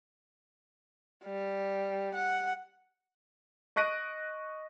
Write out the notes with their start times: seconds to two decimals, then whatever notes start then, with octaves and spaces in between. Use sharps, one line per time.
1.24 G3
2.15 F#5
3.76 D#5 C#6 F#6 A#6 D7 D#7